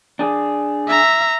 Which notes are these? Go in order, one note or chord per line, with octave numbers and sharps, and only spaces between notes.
D4 G#4
E5 A#5